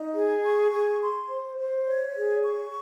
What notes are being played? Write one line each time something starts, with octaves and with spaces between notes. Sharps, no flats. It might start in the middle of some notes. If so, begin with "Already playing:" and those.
Already playing: D#4
G#4
C#6
G#4
C6
C5
C5
C#5
G#4
C#6